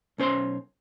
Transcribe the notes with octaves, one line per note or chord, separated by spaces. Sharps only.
B1 C#4 C5 C#5 C6